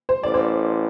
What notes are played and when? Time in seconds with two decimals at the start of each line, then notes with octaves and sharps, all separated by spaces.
0.09 C5
0.23 A1 D5
0.34 C5